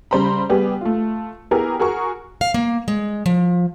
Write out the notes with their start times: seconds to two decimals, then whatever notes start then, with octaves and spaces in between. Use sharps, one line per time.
0.11 C#3 G3 C5 A#5 B5
0.49 G3 B3 G4 G#4
0.81 A3 F4
1.51 B3 E4 G4 G#4 A#4
1.80 F#4 G#4 A#4 C#6
2.41 F5
2.54 A#3
2.88 G#3
3.26 F3